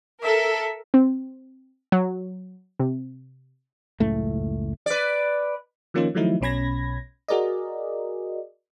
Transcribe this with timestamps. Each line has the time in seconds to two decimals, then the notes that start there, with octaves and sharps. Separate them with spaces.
0.23 A4 A#4 E5
0.94 C4
1.92 F#3
2.80 C3
4.00 F#1 C#2 A2 A3
4.86 B4 D5
5.94 D#3 F3 A#3 C#4 D#4 F4
6.15 D#3 F3 F#3 A3 D#4 E4
6.41 B1 B2 C#4 B5 G#6 A#6
7.28 F#4 G#4 A#4 D5 D#5